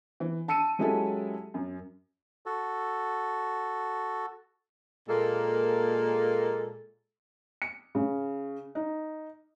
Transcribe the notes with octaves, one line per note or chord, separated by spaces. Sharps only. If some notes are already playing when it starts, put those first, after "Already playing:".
E3
A5 E6 C#7 D#7
F#3 G#3 C#4 E4 G4 A4
F#2
F#4 A4
A#2 G#3 A#3 A4
C#7
C#3
D#4